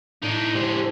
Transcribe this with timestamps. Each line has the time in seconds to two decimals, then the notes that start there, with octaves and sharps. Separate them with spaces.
0.22 A2 D4 D#4 D5
0.55 D3 G#3 G4 C5